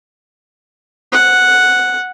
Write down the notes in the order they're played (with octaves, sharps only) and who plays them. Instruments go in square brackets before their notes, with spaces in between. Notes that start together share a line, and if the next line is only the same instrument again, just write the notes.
[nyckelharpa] F#5